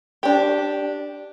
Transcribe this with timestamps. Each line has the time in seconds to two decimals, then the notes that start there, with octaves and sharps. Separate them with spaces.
0.23 D4 G4